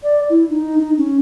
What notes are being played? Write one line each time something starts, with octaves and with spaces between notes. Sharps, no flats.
D5
E4
D#4
D#4
C#4